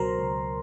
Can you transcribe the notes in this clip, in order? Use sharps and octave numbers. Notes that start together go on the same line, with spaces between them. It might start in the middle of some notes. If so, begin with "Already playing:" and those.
Already playing: C#2 B2 F#3 A#4 C5 A#5 C6
C#2